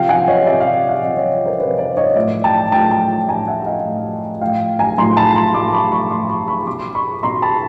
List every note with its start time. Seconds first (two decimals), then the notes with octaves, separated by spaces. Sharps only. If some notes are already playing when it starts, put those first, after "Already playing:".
Already playing: C3 F3 F5 G5
0.09 F#5 G#5
0.28 C#5 D#5
0.46 C3 F3 D5 E5
0.60 D#5 F5
0.88 E5 F#5
1.03 C3 F3 D#5 F5
1.17 C#5 D#5
1.46 A#4 C5
1.59 C3 F3 B4 C#5
1.78 C5 D5
1.97 C#5 D#5
2.16 A2 F3 D5 E5
2.44 G5 A5
2.72 A2 F3 G5 A5
2.91 G5 A5
3.29 A2 F3 G#5 A#5
3.48 E5 F#5
3.66 D#5 F5
3.85 A2 F3
4.41 A2 F3 F5 G5
4.79 G#5 A#5
4.98 A2 F3 A#5 C6
5.16 A5 B5
5.36 A#5 C6
5.54 A2 F3 C6 D6
5.73 B5 C#6
5.92 B5 C#6
6.10 A2 F3 C6 D6
6.30 B5 C#6
6.48 B5 C#6
6.67 B2 C6 D6
6.95 B5 C#6
7.23 B2 A#5 C6
7.42 A5 B5